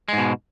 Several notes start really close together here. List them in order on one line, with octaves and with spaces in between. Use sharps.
G#3 G#2 B2